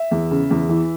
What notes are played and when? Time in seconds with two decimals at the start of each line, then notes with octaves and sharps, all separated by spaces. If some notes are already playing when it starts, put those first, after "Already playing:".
Already playing: E5
0.11 E2
0.31 C#3
0.51 E2
0.69 E3